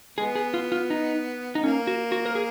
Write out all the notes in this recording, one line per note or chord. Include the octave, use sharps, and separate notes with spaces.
G#3 B3 G#4
G#4
F4
F4
D#4
D#4
A#3 C#4
F#4
F#4
A#4
G#4